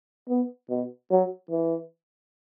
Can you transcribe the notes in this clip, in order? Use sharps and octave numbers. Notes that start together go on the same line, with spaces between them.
B3
B2
F#3
E3